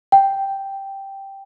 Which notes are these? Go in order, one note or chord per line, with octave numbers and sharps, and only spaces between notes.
G5